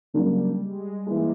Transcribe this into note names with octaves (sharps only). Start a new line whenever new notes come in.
C#3 F#3 G3 A#3 D4
G#3
E3 G#3 A#3